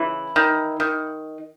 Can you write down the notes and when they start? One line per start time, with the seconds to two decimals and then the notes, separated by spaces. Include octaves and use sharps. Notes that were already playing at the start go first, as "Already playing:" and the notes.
Already playing: C#3 E3 E4
0.36 D#3
0.80 D#3